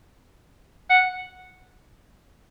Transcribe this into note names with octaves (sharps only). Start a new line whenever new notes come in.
F#5